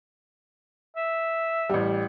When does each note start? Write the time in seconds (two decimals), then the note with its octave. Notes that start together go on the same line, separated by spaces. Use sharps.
0.97 E5
1.69 A1 G3